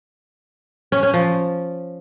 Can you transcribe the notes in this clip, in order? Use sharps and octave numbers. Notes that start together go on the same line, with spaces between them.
C#4
C#4
F3